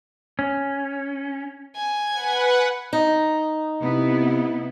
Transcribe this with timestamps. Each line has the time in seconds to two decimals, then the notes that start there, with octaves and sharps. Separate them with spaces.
0.39 C#4
1.76 G#5
2.13 B4 F#5
2.93 D#4
3.81 C3 B3 E4